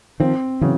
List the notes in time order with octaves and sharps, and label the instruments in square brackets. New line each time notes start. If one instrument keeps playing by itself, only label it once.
[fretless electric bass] D#3 F3 [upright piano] C4
[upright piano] C#3 [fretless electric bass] E3 F#3